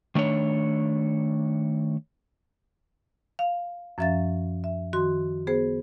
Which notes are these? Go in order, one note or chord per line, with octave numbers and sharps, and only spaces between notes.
D#3 A3 D4 C#5
F5
F#2 F3 C#4 E5 F5 A6
E5
D#3 F#4 C6
B3 G#4 C5